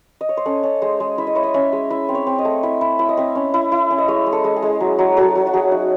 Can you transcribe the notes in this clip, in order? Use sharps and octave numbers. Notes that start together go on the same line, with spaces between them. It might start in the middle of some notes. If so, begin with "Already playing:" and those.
D#5
C#5
C5
C#4 A4
C#4
G#3 C5
G#3
E4 E5
D#5
E4 C#5
D#5
C#4 E5
G#3
E4 E5
C4
C#5
C4
D#5
A3
E4 E5
E4
E4 E5
D#5
C4 E5
C#4
E4
E4
C#4
D#5
G#3 C#5
G#3
A4
G#3
G#4
G#3
F#3
F#3
F#3 A4
F#3
F#4
F#3 G#4
D#4 F#4